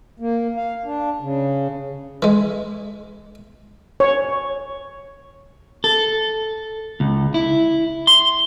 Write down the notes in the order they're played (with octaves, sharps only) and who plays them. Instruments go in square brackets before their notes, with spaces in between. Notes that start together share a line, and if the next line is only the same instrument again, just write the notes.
[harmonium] A#3
F5
D4
C#3
[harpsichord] E3 G#3
[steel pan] C#5
[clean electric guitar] A4
C#2
E4
C6